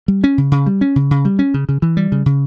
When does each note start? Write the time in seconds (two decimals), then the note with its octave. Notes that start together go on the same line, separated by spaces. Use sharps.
0.08 G3
0.24 C#4
0.38 C#3
0.52 C#3
0.66 G3
0.81 C#4
0.96 C#3
1.11 C#3
1.25 G3
1.39 C#4
1.54 C#3
1.69 C#3
1.82 E3
1.97 G3
2.12 C#3
2.26 C#3